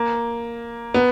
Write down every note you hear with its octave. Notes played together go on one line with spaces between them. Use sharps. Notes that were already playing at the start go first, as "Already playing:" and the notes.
Already playing: A#3
B3